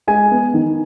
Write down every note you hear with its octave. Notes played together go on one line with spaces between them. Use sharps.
G#3 G#5
B3
D#3